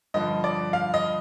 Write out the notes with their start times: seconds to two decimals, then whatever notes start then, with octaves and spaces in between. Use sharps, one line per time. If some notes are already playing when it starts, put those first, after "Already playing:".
0.14 G2 D3 F3 D#5
0.44 D5
0.73 F5
0.94 D#5